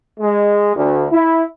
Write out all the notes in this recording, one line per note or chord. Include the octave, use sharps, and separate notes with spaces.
G#3
D2
E4